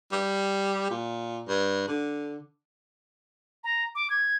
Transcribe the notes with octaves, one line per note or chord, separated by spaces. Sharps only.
G3
A#2
G2
D3
A#5
D6
G#6